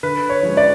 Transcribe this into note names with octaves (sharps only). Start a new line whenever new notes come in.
D3 B4
C#5
F3 G#3 C#4
D5